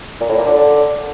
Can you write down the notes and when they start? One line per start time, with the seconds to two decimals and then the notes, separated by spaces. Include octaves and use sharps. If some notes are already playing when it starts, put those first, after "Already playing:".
0.20 A#2
0.29 A2
0.37 A#2
0.46 D3